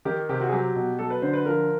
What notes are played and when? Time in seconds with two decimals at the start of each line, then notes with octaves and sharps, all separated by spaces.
0.05 D#3 G4
0.29 C3 G4
0.40 F#4
0.48 G#4
0.52 F#3 G4
0.76 B2
0.99 F#3 A4
1.10 B4
1.22 D3 C5
1.33 B4
1.45 F3 A#4